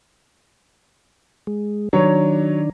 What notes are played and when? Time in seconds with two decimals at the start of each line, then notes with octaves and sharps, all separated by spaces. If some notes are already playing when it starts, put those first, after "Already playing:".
1.47 G#3
1.93 D#3 F#3 D4 C#5